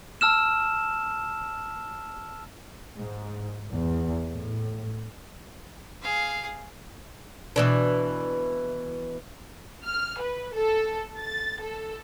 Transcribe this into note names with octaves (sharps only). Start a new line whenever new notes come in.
A5 E6 F6 E7
G#2
E2
A2
G#4 F5
B2 E3 D4
F6
B4
A4
A6
A4